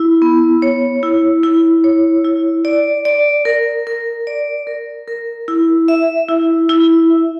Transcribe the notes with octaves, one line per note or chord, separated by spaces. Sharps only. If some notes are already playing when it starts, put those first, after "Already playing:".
Already playing: E4
B3
C#5
E4
E4
C#5
E4
D5
D5
A#4
A#4
D5
A#4
A#4
E4
E5
E4
E4
E5